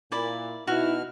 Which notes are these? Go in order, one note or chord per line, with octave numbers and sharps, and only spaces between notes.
A#2 E4 D5 B5
B2 D#4 E4 F#4 F6